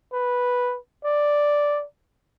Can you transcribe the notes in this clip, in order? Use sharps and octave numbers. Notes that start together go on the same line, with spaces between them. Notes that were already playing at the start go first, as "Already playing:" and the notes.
B4
D5